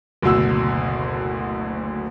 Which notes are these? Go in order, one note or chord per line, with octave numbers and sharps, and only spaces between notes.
F#1 D2 B2 E6